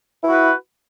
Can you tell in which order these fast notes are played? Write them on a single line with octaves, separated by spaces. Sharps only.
E4 F#4 B4